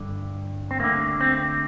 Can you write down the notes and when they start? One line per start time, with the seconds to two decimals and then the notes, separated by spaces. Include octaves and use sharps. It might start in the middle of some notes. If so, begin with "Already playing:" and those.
Already playing: G2 D3
0.71 C4
0.80 D2 D3 A#3
1.21 C4